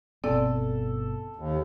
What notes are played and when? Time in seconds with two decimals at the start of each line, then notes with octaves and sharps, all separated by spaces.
0.24 G1 B2 B3 C4 A4 D5
1.36 D#2